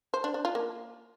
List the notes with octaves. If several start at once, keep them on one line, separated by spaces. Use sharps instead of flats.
C5
D4
D4
F4
A#3